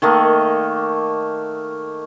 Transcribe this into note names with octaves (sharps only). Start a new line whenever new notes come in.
D#3 A3 A#3 D#5